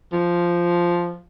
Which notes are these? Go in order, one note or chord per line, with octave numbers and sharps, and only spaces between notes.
F3